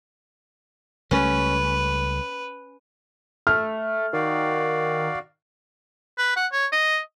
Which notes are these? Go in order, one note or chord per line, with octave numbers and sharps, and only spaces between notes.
C#2 G3 A3 C#4 B4
A3 F6
D#3 F#4 D5 F5
B4
F#5
C#5
D#5